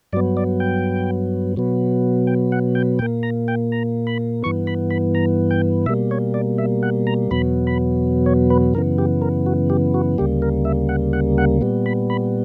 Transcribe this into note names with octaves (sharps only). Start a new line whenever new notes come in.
G2 F#3 B3 D5
D5
G5
B2 F#3 B3
G5
F#5
G5
A#2 A#3 G5
A#5
G5
A#5
B5
G2 E3 B3 C#6
B5
B5
A#5
G5
B2 G3 A#3 E5
C#5
D5
E5
F#5
A#5
E2 B2 F#3 B3 B5
B5
C#5
B4
F#2 C#3 E3 B3 A#4
G4
A#4
F#4
G4
F#4
D2 C#3 G3 A#3 G4
A#4
E5
F#5
F#5
F#5
A#2 G3 B3
B5
B5